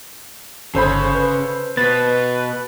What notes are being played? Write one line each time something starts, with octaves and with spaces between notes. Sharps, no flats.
G1 C#3 A4 C5 B5
B4
B2 B4 A6